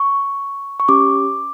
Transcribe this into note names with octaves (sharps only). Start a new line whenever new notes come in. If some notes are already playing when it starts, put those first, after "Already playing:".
Already playing: C#6
C#6
C#4 G4 D6